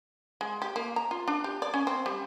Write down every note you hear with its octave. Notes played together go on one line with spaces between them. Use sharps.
G#3
G4
A#3
A#5
F4
D4
G4
D5
C#4
C4
G3